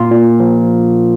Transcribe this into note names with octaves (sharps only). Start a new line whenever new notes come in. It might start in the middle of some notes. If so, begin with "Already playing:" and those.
Already playing: A#2 F4
A#2
F3